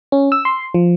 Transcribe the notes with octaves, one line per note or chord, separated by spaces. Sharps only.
C#4
E6
C6
F3